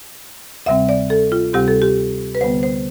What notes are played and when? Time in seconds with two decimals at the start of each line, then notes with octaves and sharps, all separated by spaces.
0.66 D2 C3 G3 C4 E5
0.89 D5
1.10 A4
1.32 F4
1.53 D2 C3 G3 C4 G4
1.68 A4
1.82 G4
2.35 B4
2.41 D2 D3 G3 B3 C5
2.63 C5